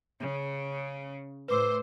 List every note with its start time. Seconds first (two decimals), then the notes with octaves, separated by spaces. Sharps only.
0.19 C#3
1.48 A2 B4 C5 D6 E6